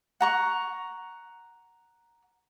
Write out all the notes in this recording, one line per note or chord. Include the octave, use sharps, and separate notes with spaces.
F#5 A#5 C#6